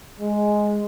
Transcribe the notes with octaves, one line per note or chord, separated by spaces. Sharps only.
G#3